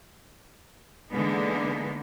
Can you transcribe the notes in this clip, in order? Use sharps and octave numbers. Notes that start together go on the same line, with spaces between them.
D3 E3 G#3 A#3 B3 D#4